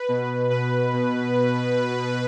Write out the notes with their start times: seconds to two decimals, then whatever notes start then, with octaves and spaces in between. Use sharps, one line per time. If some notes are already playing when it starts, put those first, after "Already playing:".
Already playing: B4
0.09 B2
0.50 B2 B4
0.93 B2